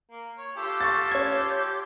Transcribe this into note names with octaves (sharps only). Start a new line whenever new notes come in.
A#3
C#5
F4 G4 A4
C#6 A6
C#4 G#6